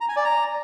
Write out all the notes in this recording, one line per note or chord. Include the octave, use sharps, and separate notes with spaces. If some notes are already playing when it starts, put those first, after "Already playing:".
A#5
G#5
D5
A#5